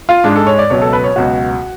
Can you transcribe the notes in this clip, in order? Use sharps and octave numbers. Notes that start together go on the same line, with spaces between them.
F4
G#2 G#3 D4
A4
C#5
D5
C#2 B2 F#3 C#5
A4
B4
C#5
C#2 B2 F#3 F#4